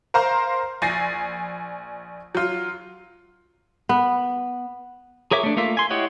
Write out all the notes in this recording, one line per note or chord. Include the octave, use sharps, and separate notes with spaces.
A#4 C5 F5 A#5 C6
A#1 G#5 A6 A#6 C7
F#3 F4
B3
G#4 A#4 C#5 E5 D6
A3 D4
A3 A#3 F4 E5
G#5 C6
E4 G4 C#5 D#5 F#5